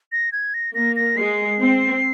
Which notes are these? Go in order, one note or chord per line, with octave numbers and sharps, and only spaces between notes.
A#6
G#6
A#6
A#3 A#6
A#6
G#3 C7
C4